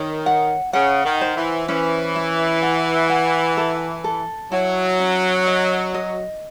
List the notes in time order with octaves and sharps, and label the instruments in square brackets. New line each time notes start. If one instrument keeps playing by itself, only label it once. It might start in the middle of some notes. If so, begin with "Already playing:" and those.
Already playing: [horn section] D#3 [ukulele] C#5
[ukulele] F#5
[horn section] C#3 [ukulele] F#5
[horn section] D#3
[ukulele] C5
[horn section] E3
[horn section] E3 [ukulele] C#4
[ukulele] E4
F#5
F#5
A4
A4
[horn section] F#3 [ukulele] E4
[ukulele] C#4
D#5
D#5